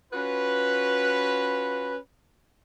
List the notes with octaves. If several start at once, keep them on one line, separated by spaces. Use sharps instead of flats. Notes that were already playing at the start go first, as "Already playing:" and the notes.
C#4 F4 F#4 B4